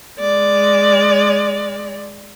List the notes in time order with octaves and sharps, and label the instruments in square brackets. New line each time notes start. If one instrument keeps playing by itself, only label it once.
[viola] G#3 D5